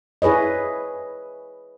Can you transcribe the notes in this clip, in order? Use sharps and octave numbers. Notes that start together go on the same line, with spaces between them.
E4 G#4 B4 C#5 D#5